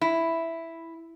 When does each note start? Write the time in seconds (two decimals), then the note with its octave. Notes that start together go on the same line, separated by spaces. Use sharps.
0.01 E4